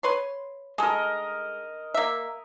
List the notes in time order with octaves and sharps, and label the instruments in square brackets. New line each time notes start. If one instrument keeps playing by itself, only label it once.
[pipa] B4 C#5 C6
[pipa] G#3 A4 [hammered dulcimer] A#4 D#5
[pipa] A#3 E5